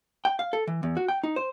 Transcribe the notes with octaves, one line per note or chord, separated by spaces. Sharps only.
G5
F5
A4
E3
E2
F#4
G5
D#4
C5